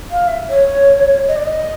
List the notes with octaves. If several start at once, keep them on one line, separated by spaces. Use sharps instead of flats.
F5
E5
C#5
D#5
D5
D#5